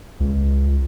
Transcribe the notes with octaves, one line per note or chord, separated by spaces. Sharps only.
C#2